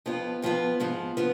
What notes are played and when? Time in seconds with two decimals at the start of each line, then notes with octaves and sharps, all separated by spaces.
0.06 F2 F3 B3 F4
0.42 F2 F3 B3 F4
0.80 G#2 F3 B3 F4
1.17 F3 B3 F4